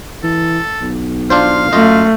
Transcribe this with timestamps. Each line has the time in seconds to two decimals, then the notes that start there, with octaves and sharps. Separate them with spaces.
0.23 E3 A4
0.81 B1
1.30 D4 F4 C5 F5
1.73 F#2 A3 F4 D#5